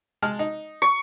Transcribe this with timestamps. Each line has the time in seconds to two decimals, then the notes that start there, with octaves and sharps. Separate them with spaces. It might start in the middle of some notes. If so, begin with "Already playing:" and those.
0.22 G#3 A5 F6
0.39 D#4
0.82 C#6